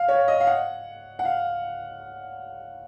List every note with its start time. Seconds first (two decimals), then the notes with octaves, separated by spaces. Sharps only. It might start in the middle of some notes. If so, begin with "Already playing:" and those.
Already playing: F5
0.08 C#5
0.28 D#5
0.41 F5
0.47 F#5
1.19 F#5
1.25 F5